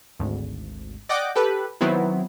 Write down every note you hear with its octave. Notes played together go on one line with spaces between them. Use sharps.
G#1 D2
D5 D#5 F#5 G5 D6
G4 A4 B4
D#3 F#3 B3 C4 E4